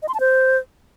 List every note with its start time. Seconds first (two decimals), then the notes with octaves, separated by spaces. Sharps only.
0.03 D#5
0.08 C6
0.14 A5
0.20 C5